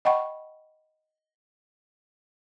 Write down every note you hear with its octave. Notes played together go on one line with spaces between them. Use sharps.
D#5 F#5 G5 B5 C#6